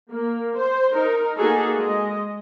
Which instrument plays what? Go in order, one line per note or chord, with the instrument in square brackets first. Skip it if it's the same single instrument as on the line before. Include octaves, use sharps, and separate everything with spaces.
[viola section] A#3
C5
D#4 A#4
A#3 D#4 F#4 G#4 A4
G#3 D#5